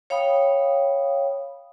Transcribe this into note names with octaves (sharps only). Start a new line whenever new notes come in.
C#5 F5 G5 B5 D#6